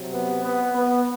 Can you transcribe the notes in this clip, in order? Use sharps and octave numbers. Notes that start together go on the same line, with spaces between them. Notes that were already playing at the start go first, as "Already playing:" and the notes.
Already playing: C3 F#3
B3
B3
B3